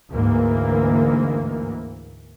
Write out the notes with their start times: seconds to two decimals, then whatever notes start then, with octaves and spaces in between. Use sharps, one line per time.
0.11 D2 G#2 E3 A#3